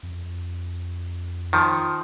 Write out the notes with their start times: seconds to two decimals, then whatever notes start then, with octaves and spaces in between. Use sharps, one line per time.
0.03 F2
1.53 D#3 F3